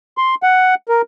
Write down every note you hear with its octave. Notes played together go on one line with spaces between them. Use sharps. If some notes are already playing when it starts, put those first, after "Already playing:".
C6
F#5
A#4